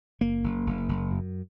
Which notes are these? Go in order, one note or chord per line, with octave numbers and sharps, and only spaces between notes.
F#1 A#3
F#1
F#1
F#1
F#2